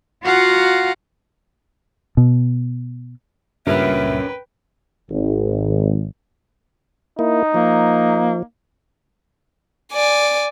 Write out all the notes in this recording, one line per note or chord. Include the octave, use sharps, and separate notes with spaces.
F4 F#4 F5 F#5 A#5
B2
C#2 G2 A#2 C#4 A#4 B4 E5 G5
G#1
A#3 D#4 E4
F3 A#3
D5 G#5